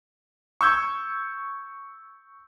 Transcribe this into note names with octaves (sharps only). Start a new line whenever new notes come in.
C#6 E6 G6 G#6